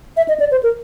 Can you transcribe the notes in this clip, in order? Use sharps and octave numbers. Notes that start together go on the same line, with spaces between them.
E5
D#5
D5
C5
A#4